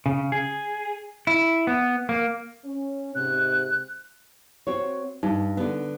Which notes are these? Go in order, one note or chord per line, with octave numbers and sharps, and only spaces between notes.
C#3
G#4
E4
B3
A#3
C#4
G#2 C3 F#6
C4 F#4 C#5
G2 D#4
D3 B3